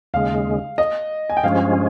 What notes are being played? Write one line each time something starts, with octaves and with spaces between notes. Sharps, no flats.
D#2 C#3 G#3 F5
D#5
G#5
G5
G2 F3 G#3 C#4 F5